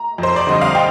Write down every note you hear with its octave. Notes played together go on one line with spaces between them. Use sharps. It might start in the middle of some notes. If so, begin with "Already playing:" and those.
Already playing: A#5
F2 C5
D5
D3 G3 C4 D#5
F5
G5